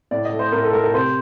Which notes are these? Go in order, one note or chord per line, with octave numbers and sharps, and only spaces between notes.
A2 D5
D#5
A3
C5
A2 A#4
A4
A3 A#4
A#4
C3 C5